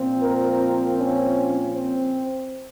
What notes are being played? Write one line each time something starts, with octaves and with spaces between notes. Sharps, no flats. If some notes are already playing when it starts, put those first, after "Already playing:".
Already playing: A#2 F3 C4
A#4
C#4
C4